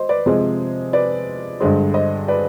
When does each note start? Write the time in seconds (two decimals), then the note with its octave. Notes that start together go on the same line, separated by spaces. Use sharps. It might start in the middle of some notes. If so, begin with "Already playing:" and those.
Already playing: C5 D#5
0.09 B4 D5
0.26 C3 F3 G#3 G#4 C5
0.93 B4 D5
1.60 G2 D3 G#3 G#4 C5
1.94 C5 D#5
2.28 B4 D5